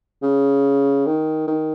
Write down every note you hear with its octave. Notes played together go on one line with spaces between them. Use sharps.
C#3
D#3
D#3